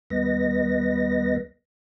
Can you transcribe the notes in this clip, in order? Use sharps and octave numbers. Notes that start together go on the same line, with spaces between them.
D#2 G3 B3 B4 D#5 A#6